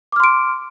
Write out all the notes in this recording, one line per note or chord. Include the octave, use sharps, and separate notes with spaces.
C6 D6 F6 D7